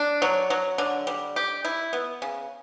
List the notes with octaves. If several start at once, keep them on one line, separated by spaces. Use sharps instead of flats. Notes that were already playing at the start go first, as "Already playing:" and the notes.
Already playing: D4
F#3
F#3
D3
G3
G4
E4
B3
C#3